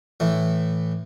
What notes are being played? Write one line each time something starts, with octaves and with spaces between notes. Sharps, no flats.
A2 E3 A3